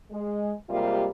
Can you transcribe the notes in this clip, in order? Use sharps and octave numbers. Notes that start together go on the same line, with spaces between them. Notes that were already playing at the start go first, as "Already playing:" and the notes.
G#3
C3 G3 G#3 A#3 F4 A#4